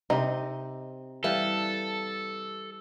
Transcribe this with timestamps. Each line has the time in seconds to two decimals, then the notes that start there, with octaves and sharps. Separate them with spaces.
0.10 C3 C4 D#4 D#5
1.24 E3 G3 A4 F5